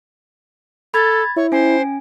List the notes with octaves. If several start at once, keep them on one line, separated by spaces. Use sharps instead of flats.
A4 B5 G#6 A6
E4 C#5
C#4 C5 G#5